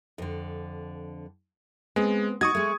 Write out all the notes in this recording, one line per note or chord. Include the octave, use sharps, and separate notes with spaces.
F2 D3
G#3 B3 C4
D#4 F#4 C#6 D#6 G#6
G#3 A3